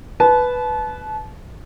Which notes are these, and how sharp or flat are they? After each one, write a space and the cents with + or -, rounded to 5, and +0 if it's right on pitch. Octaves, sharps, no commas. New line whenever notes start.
B4 +0 A5 -30